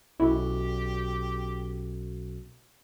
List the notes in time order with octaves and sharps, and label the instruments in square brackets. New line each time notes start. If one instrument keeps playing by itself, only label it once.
[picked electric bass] B1 [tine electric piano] C#4 F#4 A4 [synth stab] E4 [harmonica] G4